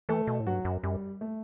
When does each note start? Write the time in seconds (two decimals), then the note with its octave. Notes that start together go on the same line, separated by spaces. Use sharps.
0.09 E3 A3 A4
0.27 B2
0.40 A2
0.46 G2 F#3 F#4
0.65 F#2
0.83 F#2 G3
1.21 A3